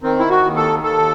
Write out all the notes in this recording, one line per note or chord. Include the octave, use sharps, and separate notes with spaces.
D#3 C4
E4
F#4
D#2
A4
D#2 A4